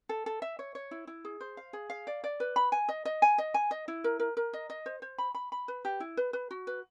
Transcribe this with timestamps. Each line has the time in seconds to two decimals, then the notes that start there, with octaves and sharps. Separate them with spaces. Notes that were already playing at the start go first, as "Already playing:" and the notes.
0.09 A4
0.26 A4
0.42 E5
0.59 C#5
0.75 C#5
0.91 E4
1.07 E4
1.25 G#4
1.41 C5
1.57 F5
1.73 G#4
1.90 F5
2.07 D5
2.24 D5
2.40 B4
2.56 B5
2.72 G#5
2.89 D#5
3.05 D#5
3.22 G#5
3.38 D#5
3.54 G#5
3.71 D#5
3.88 E4
4.04 A#4
4.20 A#4
4.37 A#4
4.53 D#5
4.70 D#5
4.86 C5
5.02 C5
5.18 B5
5.34 B5
5.52 B5
5.68 B4
5.85 G4
6.00 E4
6.17 B4
6.33 B4
6.51 F#4
6.67 B4